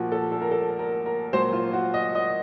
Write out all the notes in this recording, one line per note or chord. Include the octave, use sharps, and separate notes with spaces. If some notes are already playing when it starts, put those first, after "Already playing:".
Already playing: A#2 F3 F#4
A4
A4
A#4
A4
A#4
A#4
A#2 F#3 C5
F4
F#4
D#5
D#5